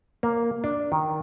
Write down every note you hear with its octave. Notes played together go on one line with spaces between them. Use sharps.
A#3
D4
D#3